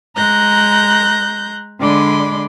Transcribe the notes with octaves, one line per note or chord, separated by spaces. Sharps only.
G#3 A#5 F#6 G6 A#6
D3 G#3 D5 B5 C6